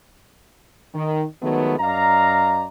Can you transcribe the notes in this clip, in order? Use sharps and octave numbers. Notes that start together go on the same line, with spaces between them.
D#3
D#3 F3 F#3 G#3 A3 B3
F#2 D5 D#5 F5 A#5